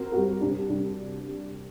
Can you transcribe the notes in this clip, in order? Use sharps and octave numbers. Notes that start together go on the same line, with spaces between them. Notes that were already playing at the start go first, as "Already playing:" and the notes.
Already playing: C4 F#4 A#4
G3 C4 F#4 A#4
C3 G3 D4
C3 G3 D4